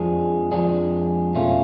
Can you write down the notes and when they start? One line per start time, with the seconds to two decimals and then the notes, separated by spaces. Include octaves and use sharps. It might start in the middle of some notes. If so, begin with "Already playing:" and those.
Already playing: F2 F3 G#3 D4 G#4
0.52 F2 F3 G#3 D4 G#4
1.35 B2 A3 C#4 F4